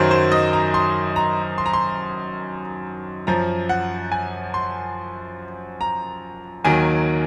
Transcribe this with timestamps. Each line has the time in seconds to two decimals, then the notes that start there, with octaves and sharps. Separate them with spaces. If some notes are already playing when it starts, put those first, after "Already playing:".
Already playing: F#2 D#3 F#3 C5
0.11 C5
0.32 D#5
0.53 A#5
0.74 C6
1.16 A#5
1.58 C6
1.66 A#5
1.73 C6
3.27 F#2 F3 A#5
3.69 F#5
4.12 G#5
4.54 C6
5.81 A#5
6.64 D#2 D#3 F#3 G#5